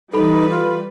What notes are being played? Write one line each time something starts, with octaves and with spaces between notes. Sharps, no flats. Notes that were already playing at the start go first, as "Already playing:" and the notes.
E3 G3 D#4 A4 B4 B5
F4